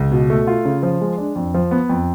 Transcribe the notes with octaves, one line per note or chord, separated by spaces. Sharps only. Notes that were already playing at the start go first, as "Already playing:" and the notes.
Already playing: C#2
B2
A3
F4
C#3
F3
G#3
D4
F2
F3
B3
F2